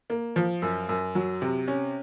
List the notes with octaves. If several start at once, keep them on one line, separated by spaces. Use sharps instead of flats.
A#3
F3
F#2
F#2
F#3
C3
C#4